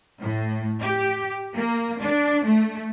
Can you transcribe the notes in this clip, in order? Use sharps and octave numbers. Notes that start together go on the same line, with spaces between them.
A2
G4
A#3
D4
A3